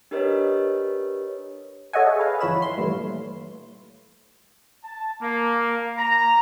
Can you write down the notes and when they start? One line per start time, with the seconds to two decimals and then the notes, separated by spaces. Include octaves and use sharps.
0.11 D4 G4 A#4 B4 C#5 D#5
1.93 A4 C#5 D#5 E5 F#5 G#5
2.07 G#4
2.19 B4 F5
2.40 G1 E3 F3 C#5 B5 E7
2.62 C6
2.78 G2 A#2 E3 A3
4.84 A5
5.22 A#3
5.98 A#5